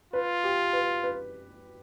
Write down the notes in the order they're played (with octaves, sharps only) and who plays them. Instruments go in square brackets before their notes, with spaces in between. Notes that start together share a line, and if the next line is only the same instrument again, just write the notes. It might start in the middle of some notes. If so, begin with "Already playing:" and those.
[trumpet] F4 [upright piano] B4
[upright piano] G4
B4
B4